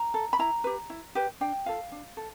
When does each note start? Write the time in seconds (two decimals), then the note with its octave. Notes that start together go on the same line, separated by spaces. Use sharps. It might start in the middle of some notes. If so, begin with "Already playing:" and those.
Already playing: A#5
0.14 A4
0.33 B5
0.39 E4 A#5
0.64 G4 B4
0.90 E4
1.15 G4 B4
1.41 D4 G5
1.66 F4 A4 F5
1.92 D4
2.17 A4